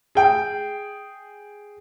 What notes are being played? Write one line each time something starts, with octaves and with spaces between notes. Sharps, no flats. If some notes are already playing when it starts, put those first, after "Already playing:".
G#4 G5